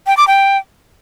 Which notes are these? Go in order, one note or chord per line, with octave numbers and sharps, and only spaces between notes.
G5
D6
G5